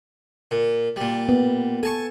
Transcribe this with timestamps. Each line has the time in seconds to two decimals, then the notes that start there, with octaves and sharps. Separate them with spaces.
0.51 A#2
0.96 A#2 G3
1.29 B3
1.83 A4 G#5 A5 C#6